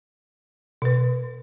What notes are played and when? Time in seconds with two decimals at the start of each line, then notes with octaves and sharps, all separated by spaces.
0.82 B2 B4